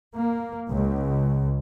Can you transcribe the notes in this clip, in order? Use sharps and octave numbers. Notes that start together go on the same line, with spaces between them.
A#3
C#2